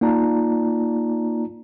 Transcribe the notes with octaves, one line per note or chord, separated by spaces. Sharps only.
A#3 D#4 F4 D5 A5 A#5